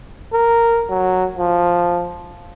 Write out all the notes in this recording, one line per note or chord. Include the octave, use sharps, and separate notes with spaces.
A#4
F#3
F3